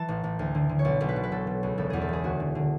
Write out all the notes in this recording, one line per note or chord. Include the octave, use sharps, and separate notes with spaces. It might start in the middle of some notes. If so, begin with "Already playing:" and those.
Already playing: E3 A5
A1
A1
D2
D3
D3
C#5
B1 D5
B1
B4
B2
B4
B2 A4
B2
C#2
E1 A4
E2 G#4
A4
E1 G#4
D2 F#4
D3
D3